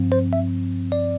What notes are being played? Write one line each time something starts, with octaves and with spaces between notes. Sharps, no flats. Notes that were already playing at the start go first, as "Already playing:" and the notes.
Already playing: G2 F3 C4
C5
E5
D5